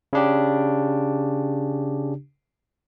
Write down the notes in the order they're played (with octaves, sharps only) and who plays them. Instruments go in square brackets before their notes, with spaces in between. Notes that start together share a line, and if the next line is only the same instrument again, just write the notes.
[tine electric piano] C#3 D4 G4